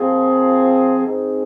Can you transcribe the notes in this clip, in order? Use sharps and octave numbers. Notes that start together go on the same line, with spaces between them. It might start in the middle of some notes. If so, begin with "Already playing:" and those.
Already playing: A#2 F3 C4 G#4
G#2 D#3 C4 D#4 G#4